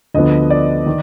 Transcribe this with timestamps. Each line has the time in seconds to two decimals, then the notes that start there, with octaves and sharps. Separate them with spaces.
0.14 D2 D3 F3 B3 D#5
0.50 D5
0.86 D#3